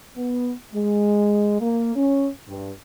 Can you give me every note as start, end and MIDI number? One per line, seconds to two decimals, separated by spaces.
0.17 0.52 59
0.74 1.56 56
1.61 1.95 58
1.96 2.28 61
2.48 2.71 43